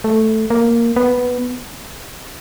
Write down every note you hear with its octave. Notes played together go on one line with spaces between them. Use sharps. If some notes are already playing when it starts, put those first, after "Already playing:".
A3
A#3
B3